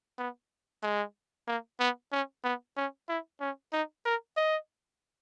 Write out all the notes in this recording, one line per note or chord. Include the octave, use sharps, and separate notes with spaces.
B3
G#3
A#3
B3
C#4
B3
C#4
E4
C#4
D#4
A#4
D#5